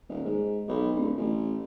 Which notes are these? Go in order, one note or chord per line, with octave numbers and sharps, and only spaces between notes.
D#1
G#2
B1
D1
A1